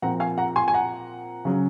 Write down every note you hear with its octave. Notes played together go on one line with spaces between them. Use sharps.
A#2 F3 C4 F#5 A#5
F5 G#5
F#5 A#5
G#5 C6
G#5
F#5 A#5
C#3 F#3 C#4